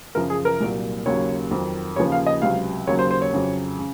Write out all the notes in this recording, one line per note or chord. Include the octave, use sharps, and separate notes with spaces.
F#2 C#3 F3 A#4
G#4
A#4
C2 A#2 F#3
D#2 C#3 F#3 C#5
F2 D#3 F#3
D#2 C#3 F3 C#5
F5
D#5
C#2 C3 F#3 F5
D#2 C#3 F#3 C#5
C5
C5
C#5
F2 C#3 F#3
C#3